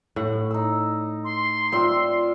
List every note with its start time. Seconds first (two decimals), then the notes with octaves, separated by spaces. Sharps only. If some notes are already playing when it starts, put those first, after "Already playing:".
0.16 A2 F#5
0.51 D#4 E6
1.24 C6
1.72 C4 F4 D5 E5